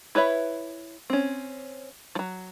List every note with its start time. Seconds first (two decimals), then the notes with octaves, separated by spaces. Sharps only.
0.15 E4 B4 C#5 E5
1.10 C4 C#4
2.15 F3 F#3